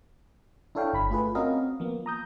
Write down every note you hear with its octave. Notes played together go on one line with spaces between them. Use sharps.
D4 E4 A4 C#5 F5 G5
G1 B5 B6
A3 F4 G#4 B4
C4 C#4 F#4 A#4 D#5 F5
F3 A#3 B3
A#5 D#6 G6